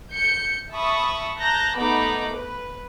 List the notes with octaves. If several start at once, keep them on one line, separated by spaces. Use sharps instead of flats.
G6 C#7
E5 A5 B5 C#6 D#6
A5 A#5 F#6 G6 A#6
A3 B3 D#4 B5 D6
B4